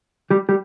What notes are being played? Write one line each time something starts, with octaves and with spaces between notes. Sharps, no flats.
G3 G4
G3 G4